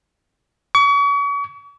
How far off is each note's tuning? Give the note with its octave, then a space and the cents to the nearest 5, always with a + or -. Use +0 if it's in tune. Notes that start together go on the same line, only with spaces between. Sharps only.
C#6 +40